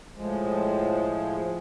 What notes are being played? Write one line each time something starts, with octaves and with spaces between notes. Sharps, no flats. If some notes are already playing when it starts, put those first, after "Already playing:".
A2 F3 G#3